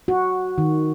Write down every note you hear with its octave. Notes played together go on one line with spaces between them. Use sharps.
F#4
D#3